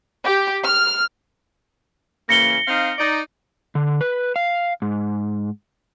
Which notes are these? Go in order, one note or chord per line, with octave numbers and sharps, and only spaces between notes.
G4
F6
C#3 E3 A#3 A#6 C#7 G7
C4 D#4 F5
D#4 D5
D3
B4
F5
G#2